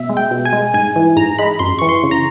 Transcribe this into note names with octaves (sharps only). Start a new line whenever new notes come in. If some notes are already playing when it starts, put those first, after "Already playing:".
Already playing: B2 E5
G#3
G5
B2
G#5
G#3
G#2 G#5
E3
G#2 A#5
G#3 B5
F#2 C6
E3 C#6
C6
C#3
A#5